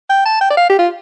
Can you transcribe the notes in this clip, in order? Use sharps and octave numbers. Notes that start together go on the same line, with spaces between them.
G5
A5
G5
D5
F5
G4
F4